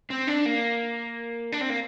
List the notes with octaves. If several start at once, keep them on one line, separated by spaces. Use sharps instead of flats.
C4
D4
A#3
D4
C4
A#3